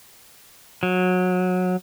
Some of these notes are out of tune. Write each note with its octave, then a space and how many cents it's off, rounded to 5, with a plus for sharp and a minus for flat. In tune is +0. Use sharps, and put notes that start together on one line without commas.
F#3 -20